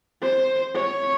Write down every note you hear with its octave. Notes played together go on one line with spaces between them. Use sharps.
C5
C#5